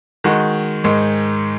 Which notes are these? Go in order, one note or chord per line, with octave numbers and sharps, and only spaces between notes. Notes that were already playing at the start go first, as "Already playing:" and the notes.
D#3 G#3 F#4
G#2 D#3 G#3